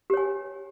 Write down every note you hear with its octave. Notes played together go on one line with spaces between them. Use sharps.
G4 C#5 G#5